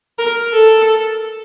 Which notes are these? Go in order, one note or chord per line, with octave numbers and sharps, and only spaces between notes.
A#4
A4